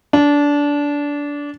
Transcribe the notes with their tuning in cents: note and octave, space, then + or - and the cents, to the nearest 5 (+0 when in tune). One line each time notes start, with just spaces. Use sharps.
D4 -20